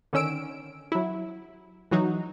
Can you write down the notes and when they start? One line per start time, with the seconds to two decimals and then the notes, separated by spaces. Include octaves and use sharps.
0.13 D3 D#3 C#4 E6 D7
0.92 F#3 E4
1.91 E3 F#3 D#4 F#4